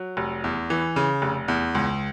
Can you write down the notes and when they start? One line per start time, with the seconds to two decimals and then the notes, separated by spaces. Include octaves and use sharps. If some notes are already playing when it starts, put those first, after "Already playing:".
Already playing: F#3
0.17 F1
0.44 E2
0.70 E3
0.96 C#3
1.22 F1
1.48 E2
1.75 C#2